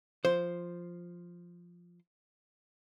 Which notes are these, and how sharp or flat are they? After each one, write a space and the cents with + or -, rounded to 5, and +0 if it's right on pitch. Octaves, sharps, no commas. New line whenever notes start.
F3 +0 C5 +0